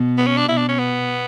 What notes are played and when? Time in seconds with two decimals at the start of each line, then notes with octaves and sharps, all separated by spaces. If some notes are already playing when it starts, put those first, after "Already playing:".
Already playing: B2
0.18 B3
0.27 C#4
0.37 D4
0.48 B2 E4
0.58 D4
0.68 C#4
0.79 B3